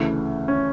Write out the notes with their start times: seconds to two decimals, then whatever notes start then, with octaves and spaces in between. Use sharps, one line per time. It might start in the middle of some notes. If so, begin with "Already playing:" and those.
Already playing: D2 C#3 E3 A3
0.48 C#4